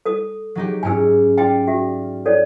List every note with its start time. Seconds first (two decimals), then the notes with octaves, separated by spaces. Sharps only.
0.05 A4 D#6
0.55 F#3 D#4 G4
0.83 G#2 C#4 G#5 E6
1.38 F4 D5 G5
1.67 F#4 E5
2.26 A4 C#5 D5